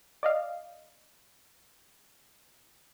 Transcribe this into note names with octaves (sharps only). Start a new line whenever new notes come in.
D5 D#5 F5